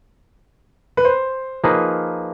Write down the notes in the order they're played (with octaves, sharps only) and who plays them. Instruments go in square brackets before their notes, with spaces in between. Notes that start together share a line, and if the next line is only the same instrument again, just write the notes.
[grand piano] B4
C5
[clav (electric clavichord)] F3 A#3 D#4 G#4 B4